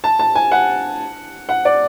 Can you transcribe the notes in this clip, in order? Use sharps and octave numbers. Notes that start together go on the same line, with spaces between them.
A5
A5
G#5
F#5
F#5
D5